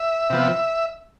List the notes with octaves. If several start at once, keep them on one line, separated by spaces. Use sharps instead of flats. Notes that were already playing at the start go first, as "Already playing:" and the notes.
Already playing: E5
C3 F3 B3